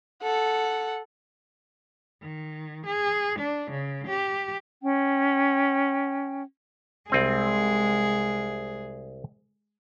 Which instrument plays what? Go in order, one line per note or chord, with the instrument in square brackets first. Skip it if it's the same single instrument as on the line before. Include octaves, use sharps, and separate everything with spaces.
[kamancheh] A4 F#5
[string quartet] D#3
G#4
D4
C#3
G4
[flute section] C#4 G5
[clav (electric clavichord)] C2 C4 G#5 [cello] G#3 G#4